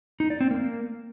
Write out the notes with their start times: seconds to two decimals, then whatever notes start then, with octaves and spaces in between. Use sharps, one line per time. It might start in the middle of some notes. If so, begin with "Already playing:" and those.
0.20 D#4
0.30 D5
0.41 C4
0.51 A#3